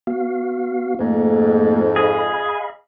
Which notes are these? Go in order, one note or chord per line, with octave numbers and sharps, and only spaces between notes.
B3 F#4 F5
F2 G#2 A3 A#3
G#4 D#5 F5 B5